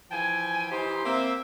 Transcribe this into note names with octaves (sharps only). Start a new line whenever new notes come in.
E3 F3 G5 G#5
E3 D#4 G4 C5
A#3 C4 E5